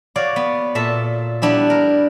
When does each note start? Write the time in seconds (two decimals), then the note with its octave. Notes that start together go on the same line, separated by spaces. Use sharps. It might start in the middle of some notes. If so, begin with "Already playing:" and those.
0.16 F#4 C#5 D5 F5
0.36 B3
0.75 A#2 A4 E5
1.42 G3 B3 D4 E4 G4
1.70 A#4